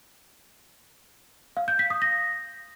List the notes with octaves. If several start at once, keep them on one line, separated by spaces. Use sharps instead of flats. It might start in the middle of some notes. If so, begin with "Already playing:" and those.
F5
G6
B6
D#6
A#6